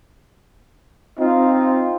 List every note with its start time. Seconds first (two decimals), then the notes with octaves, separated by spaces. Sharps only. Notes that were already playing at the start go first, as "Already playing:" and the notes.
1.19 C4 D#4 F4